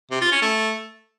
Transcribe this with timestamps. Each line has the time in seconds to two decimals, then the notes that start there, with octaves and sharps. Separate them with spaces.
0.11 C3
0.21 F4
0.32 C#4
0.42 A3